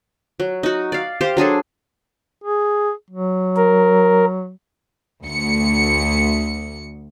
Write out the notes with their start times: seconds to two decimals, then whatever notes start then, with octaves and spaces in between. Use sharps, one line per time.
0.40 F#3
0.63 D#4 F#4
0.92 D5 F5
1.21 G4 C5 F5
1.37 F#3 D4 G#4 A4
2.44 G#4
3.11 F#3
3.56 A#4
5.23 D2 C#7